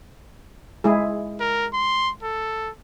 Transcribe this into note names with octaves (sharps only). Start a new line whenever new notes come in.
G#3 E4 G#4
A#4
C6
A4